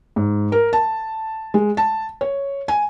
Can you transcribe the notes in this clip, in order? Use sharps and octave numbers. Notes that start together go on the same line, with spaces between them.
G#2
A#4
A5
G#3
A5
C#5
G#5